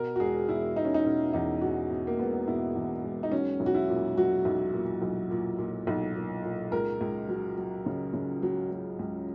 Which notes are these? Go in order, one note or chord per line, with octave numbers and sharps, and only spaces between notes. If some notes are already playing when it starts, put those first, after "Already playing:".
Already playing: B2 A#4
F#4
E1 G#4
E1 E4
E1 D#4
C#4
D#4
B2 C#4
E2 D#4
E2 F#4
B2
A#3
E1 B3
B2 E4
E2
E1
D#4
F#3 C#4
B1
F#4
E4
A#2
F#3 F#4
B1
A#2
B1
A#2
A#2
B1
A#2
A#2
C#2 A#4
C#2
F#3
F#3
C#3
C#3
F#3
F#3
C#2